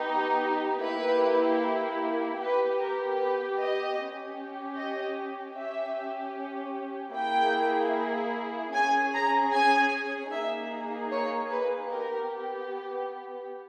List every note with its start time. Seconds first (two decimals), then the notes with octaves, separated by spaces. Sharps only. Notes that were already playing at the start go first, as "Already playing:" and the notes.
Already playing: B3 D#4 G4
0.82 A#3 E4 G4 B4
2.40 B3 G4 B4
2.79 A#4
3.19 B4
3.58 D#5
3.99 C#4 G4
4.77 D#5
5.57 C#4 G4 E5
7.15 A#3 E4 G#4 G5
8.74 C#4 G#4 G#5
9.14 A#5
9.53 G#5
10.32 A#3 D#4 G#4 E5
11.12 C#5
11.51 B4
11.90 B3 G4 A#4